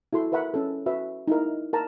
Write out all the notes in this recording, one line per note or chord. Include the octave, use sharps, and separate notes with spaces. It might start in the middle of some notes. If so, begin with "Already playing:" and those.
E4 F#4 A4 C6
A#4 B4 E5 F#5 B5
C#4 A4
F#4 B4 E5
D#4 E4 A#4
A#4 F#5 A5 A#5